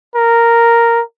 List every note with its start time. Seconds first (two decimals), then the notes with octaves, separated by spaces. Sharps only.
0.16 A#4